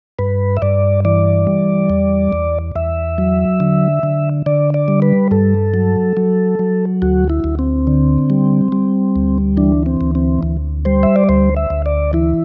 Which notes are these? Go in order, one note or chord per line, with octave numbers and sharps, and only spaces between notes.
G2 B4
E5
G2 D5
E3 D5
G3
E2
E2
E2 E5
F#3
D3
D3
D3 D5
D5
G3
B4
G2 A4
F#3
F#3
F#3
D2 F#4
E4
D2
C4
D3
G3
G3
D2
E3 D4
C4
D2
C4
D2
G3 C5
E5
D5
D2 C5
E5
D2
D5
E3 E4